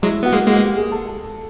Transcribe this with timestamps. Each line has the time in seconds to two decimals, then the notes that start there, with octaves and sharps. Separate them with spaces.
0.02 F#3 G#3 E4
0.23 B3 F#4
0.32 G#3 A#3
0.47 G#3 A#3 F#4
0.62 G4
0.77 G#4
0.92 A4